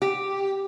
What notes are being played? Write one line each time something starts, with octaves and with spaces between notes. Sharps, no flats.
G4